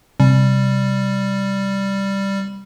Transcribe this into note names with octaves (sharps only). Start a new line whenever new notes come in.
C3 G3